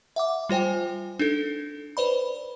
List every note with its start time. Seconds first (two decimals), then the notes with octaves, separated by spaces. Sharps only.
0.16 E5 F#5 D6
0.49 G3 F4 C5 G5 G#5
1.19 D4 D#4 A4
1.97 B4 C5 D5 B5